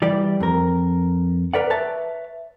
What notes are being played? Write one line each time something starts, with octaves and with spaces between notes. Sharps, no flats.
E3 G3 D5
F2 A#4
A#4 B4 D5 F#5
B4 C#5 E5 A5